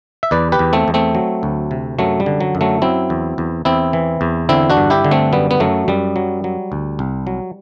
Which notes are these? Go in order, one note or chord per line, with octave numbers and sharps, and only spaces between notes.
E5
E2 B4 D5
G4 B4
E2
A3 C4
E2
A3 C4
F#3
D2
C3
F#2 F#3 A3
G3
D3
F#3
F#2
F#3 A3
F#3 C4 E4
E2
E2
E2 C4 E4
E3
E2
D3 C4 E4
D4 F#4
G2
E4 G4
D3
A3 C4
F#2 G3 B3
B3
F#2 F#3 A3
F#2 G3
F#3
F#3
D2
C2
F#3